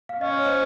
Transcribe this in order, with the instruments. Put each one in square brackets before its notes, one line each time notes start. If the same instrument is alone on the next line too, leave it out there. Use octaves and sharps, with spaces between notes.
[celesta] F5
[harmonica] C#4 [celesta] D#5
[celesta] C#5
C5 D#5